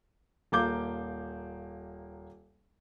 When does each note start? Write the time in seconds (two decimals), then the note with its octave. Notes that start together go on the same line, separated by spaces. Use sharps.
0.52 D#1 A#3 D6 G6